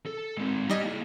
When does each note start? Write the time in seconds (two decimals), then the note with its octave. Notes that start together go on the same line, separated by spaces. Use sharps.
0.06 A4
0.38 G#3 C4
0.70 G3 D#4 D#5 G#5
0.84 A#3 E4